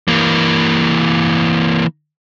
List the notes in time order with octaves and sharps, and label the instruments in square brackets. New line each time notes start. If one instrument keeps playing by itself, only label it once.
[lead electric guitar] E3 A#3